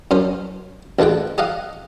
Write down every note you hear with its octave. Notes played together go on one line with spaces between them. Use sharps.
F#2 C#4 C5
A1 D2 G#3 F#5 G5
G4 D#5 F5 F#5